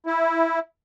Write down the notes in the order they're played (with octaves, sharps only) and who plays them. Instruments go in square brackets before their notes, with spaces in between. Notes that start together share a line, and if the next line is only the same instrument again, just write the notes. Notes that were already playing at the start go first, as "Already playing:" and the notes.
[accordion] E4